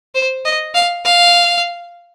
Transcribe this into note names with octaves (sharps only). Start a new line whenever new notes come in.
C5
D#5
F5
F5